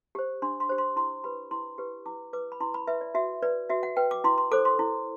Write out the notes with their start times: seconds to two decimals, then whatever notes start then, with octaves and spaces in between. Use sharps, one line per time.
0.15 G4 C5
0.42 D4 C6
0.60 C6
0.69 G4 C5
0.78 C6
0.96 E4 C6
1.24 G4 B4 B5
1.51 E4 C6
1.78 G4 B4
2.06 E4 D6
2.33 B4 D6
2.52 B5
2.60 E4 C6
2.74 B5
2.87 B4 E5
3.01 D5
3.15 F#4 E5
3.42 B4 D5
3.70 F#4 E5
3.83 F#5
3.97 B4 G5
4.11 D6
4.24 E4 C6
4.38 C6
4.51 A4 C5 D6
4.65 C6
4.79 E4